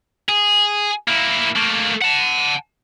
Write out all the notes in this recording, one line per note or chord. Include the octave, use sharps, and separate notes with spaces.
G#4
A#3 E4
A3 A#3
F#5 A5